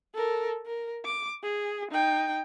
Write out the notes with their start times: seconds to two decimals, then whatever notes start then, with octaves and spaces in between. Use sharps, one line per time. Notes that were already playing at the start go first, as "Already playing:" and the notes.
0.15 A4 A#4
0.66 A#4
1.05 D6
1.44 G#4
1.91 D#4 G5